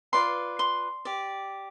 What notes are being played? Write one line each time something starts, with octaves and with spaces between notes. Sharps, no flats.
F4 B4 D5 C6
C6
G4 D5